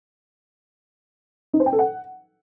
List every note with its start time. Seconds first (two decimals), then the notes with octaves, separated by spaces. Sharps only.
1.54 D#4
1.60 C5
1.66 G5
1.72 A4
1.79 F#5